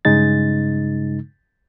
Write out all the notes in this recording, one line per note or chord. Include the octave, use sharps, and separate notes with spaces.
G2 C#3 G#3 D#4 A6